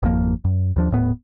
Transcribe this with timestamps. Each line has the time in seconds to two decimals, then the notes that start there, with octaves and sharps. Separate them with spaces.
0.03 G#1 F2 F3 A#3
0.45 F#2
0.76 D#2 F3 D4
0.91 D#1 A2 B3